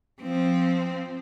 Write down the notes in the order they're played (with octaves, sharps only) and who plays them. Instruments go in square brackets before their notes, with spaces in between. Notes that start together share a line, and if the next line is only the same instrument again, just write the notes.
[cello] F3 C4